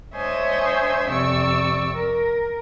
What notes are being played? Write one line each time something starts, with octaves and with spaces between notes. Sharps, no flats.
D4 C5 C#5 D#5 E5 G#5
F2 C3 D5 C#6 E6
A#4